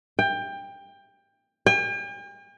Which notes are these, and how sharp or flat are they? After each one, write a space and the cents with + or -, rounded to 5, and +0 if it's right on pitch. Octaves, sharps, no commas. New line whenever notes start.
G5 +20
G5 +45